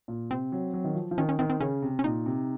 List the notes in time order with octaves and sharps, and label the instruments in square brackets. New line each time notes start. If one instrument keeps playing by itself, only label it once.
[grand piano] A#2
[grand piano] C3 [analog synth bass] C4
[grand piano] F#3
F#3
D#3
F3
F3
[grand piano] D#3 [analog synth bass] C#4
[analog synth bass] C#4
[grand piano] D#3 [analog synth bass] C4
[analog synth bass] C4
[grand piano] C#3 [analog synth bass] C#4
[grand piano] C3
[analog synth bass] C#4
[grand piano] A#2 [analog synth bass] D#4
[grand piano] C3